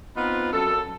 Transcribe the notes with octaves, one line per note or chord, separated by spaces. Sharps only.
B3 C4 D#4 F4 B4
F#2 A4